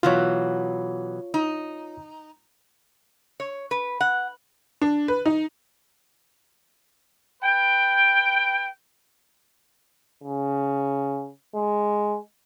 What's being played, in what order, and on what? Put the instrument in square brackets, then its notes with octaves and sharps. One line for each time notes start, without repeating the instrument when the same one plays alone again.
[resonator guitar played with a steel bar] B2 E3 F#3 [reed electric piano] F4 C#5
[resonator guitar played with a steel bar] D#4
C#5
B4
F#5
[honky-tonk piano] D4
B4
D#4
[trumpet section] B4 G5
[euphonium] C#3
G#3